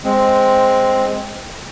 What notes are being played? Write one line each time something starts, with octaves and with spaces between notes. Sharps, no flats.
G#3 C4